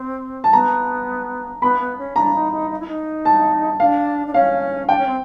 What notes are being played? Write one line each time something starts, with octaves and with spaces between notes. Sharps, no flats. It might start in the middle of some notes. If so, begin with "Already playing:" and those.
Already playing: C4
A5
B3 A#5
B3 B5
B3
C#4
D4 A#5
D#4
D#4
D#4
E4
D#4
A5
D4 F5
D4
C#4 F5
D4 G5
C#4
C4